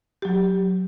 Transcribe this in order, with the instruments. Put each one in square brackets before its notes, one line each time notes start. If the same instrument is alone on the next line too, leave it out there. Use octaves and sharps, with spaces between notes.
[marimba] F#3 G4